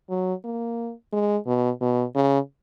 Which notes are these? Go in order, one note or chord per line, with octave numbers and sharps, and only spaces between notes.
F#3
A#3
G#3
B2
B2
C#3